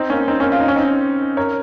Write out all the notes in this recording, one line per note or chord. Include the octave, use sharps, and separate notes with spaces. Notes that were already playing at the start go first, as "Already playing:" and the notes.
Already playing: C4 D#4
A#3 C#4
C4 D#4
A#3 C#4
F4
D#4
C#4
C4 D#4
A#4 C#5